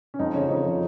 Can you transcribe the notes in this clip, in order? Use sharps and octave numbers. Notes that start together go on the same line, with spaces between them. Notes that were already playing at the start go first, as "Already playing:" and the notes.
C#4
F2 D#4
C#3 F3 C#5
F2 D#4
C#3 F3